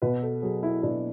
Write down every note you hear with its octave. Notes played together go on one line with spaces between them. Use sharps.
B2 B4
A4
F#3 G#4
E4
B2 D4